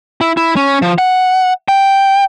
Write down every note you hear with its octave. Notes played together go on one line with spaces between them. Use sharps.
E4
E4
C#4
F3
F#5
G5